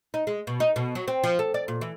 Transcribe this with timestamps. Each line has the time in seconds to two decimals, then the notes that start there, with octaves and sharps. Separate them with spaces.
0.14 D#4
0.27 G#3
0.47 B2
0.60 D#4
0.76 B2
0.95 F#3
1.08 C4
1.24 F3
1.39 A4
1.54 D5
1.68 A#2
1.81 E3